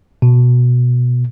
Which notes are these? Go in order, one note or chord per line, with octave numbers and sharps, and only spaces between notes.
B2